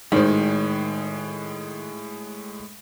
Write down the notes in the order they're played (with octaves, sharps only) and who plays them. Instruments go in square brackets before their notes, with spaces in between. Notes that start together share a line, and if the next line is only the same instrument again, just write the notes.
[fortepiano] G#1 C5 [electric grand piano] A2 G#3 [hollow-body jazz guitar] D#3